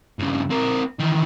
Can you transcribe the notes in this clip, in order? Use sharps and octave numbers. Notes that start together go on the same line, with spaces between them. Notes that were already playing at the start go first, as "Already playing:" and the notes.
G2 C#3
C4 A#4
D#3 E3